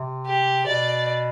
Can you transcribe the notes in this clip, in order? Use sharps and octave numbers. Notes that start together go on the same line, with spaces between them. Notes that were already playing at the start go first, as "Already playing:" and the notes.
Already playing: C3
G4
B2 D5